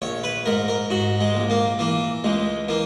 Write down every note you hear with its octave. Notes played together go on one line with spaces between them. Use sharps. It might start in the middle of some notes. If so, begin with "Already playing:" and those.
A#1 C#5
B4
G#2 A#4
A#4
G#2 F#4
G#3
A#1
A#3
E3 A#3
C#2 G#3
E3 A#3